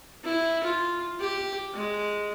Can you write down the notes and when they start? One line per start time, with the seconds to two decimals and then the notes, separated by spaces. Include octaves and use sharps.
0.24 E4
0.64 F4
1.20 G4
1.74 G#3